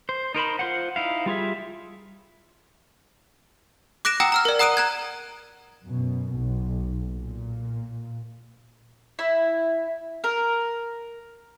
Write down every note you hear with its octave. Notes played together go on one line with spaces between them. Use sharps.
C5
D#4 A#4 C5 B5
F4 C5 F#5
D#4 E4 F5
G3 F4 G#4 E5
D6 F#6 A#6 D7 E7
F#5 G5 A#5 D#6 E6 C#7
A#5 E6 F6
A#4 D5
F#5 A#5 D#6 F#6 D7 D#7
A#5 F#6 G#6
F#2 B2
B1
A#2
E4
A#4